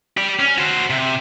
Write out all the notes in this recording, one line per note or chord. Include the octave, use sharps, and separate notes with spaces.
G4 D5
C#4
F#4 C5
C3